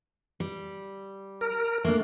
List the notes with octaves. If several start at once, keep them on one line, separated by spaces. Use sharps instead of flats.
G3
A#4
A3 A#3 D4